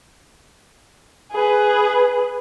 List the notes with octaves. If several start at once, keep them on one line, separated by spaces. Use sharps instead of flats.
G#4 B4